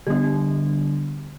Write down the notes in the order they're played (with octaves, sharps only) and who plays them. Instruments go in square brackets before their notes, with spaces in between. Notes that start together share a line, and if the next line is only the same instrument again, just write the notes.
[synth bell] D3 G3 B3 D4 G4